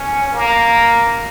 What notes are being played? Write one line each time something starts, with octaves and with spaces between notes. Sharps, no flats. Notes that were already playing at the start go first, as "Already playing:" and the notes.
Already playing: C#4
A#3